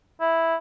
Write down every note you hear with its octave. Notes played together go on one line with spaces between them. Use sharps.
E4